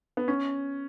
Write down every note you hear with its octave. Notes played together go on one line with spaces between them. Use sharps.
B3
C#4